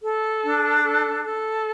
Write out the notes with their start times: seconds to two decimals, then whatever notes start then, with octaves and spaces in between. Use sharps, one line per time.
0.04 A4
0.45 D4
0.85 A4
1.25 A4